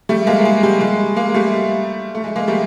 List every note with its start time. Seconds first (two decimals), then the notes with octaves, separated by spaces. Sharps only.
0.09 G3 A3
0.27 G#3 A#3
0.45 G#3
0.63 G3
0.81 G#3
1.16 G#3 A#3
1.34 G3 A3
2.15 A3
2.24 G#3
2.36 G#3 A#3
2.48 G3 A3